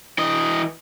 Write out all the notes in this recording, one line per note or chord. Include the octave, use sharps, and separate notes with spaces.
E3 D#5